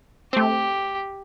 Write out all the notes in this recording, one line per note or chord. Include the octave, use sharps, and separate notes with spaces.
A3 C4 G4